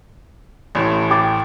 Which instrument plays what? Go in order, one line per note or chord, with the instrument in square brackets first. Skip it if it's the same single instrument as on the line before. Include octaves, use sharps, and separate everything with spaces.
[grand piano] A1 A2
[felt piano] G5 D6 A6